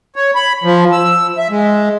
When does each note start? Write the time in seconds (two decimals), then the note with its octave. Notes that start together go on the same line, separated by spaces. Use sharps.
0.16 C#5
0.35 B5
0.64 F3
0.92 E6
1.38 E5
1.50 G#3